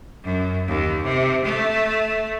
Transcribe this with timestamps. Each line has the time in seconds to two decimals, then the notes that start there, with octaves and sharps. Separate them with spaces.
0.24 F#2
0.68 D#2
1.03 C3
1.44 A3